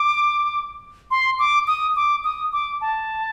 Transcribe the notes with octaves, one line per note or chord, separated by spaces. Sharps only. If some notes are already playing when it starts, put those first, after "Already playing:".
Already playing: D6
C6
D6
D#6
D6
D#6
D6
A5